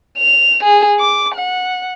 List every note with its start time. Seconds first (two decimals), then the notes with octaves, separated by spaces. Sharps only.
0.19 F7
0.63 G#4
0.99 D6
1.35 F#5